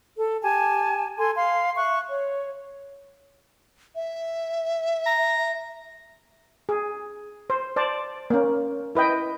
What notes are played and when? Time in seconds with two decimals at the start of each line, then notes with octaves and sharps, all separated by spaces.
0.17 A4
0.42 G4 G#5 A5
1.19 A4 G#5 C6
1.35 F5 C6
1.77 E5 C#6 F#6
2.09 C#5
3.95 E5
5.06 A#5
6.69 G#4
7.50 C5
7.76 C5 D5 A5
8.30 A#3 C#4
8.95 E4 B4 D#5 G5